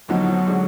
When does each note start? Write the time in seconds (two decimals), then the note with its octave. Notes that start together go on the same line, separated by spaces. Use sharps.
0.09 D2 D3 F3 F#3 B3 D#4
0.47 D3 G#3 D4